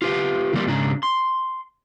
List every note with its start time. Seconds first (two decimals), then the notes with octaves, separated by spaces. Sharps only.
0.02 F4 G4 B4 F5
0.53 D3 E3 G3 A#3 F4 D5
0.67 G#2 C#3 D4 A#5
1.03 C6